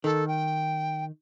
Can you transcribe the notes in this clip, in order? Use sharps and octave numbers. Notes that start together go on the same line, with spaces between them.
D#3 A4
G5